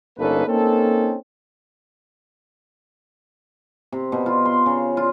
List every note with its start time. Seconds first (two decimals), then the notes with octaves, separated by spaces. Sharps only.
0.18 G1 A#3 C#4 D#4 A4 B4
0.48 A#3 C4 C#4 D#4 A4
3.92 C3
4.12 B2
4.26 F4
4.45 C6
4.66 C#3
4.97 F4